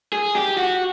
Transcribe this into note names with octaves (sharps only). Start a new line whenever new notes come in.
G#4
G4
F#4